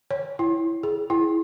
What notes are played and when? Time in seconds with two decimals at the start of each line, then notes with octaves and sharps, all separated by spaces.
0.11 C#5
0.39 E4
0.83 G#4
1.10 E4